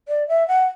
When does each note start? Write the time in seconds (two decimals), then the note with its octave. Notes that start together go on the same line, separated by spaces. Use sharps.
0.08 D5
0.28 E5
0.48 F#5